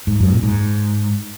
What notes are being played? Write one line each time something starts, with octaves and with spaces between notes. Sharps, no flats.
G#2
F#2
A#2
G#2